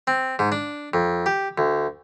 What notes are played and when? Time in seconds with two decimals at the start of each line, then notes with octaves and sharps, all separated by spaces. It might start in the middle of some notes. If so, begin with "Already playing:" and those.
0.07 C4
0.39 G#2
0.52 D4
0.94 F2
1.26 G4
1.58 D2